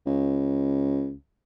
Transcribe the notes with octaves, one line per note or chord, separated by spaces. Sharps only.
C#2